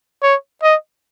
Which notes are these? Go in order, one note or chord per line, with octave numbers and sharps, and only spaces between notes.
C#5
D#5